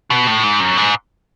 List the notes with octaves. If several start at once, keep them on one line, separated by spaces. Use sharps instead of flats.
B2
A2
G#2
F#2
G#2